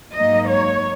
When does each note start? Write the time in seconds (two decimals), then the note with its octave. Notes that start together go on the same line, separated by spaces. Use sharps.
0.16 G#2 F#3 A#3 D#4 D#5
0.49 C#5